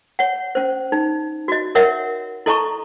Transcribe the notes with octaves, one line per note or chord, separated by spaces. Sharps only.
C#5 F#5
C#4 C5
D#4
F#4 D#5
A#4 C#5 D#5 E5 F#5
E4 A4 D#5 A5 A#5 C#6